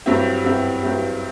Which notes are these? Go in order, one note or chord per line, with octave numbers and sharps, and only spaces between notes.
G2 F#3 C4 E4 G4
G2 F#3 C4 E4 G4
G2 F#3 C4 E4 G4